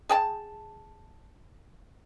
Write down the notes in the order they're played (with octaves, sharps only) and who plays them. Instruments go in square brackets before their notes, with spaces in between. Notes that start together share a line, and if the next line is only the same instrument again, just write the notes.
[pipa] G#4 G5 A5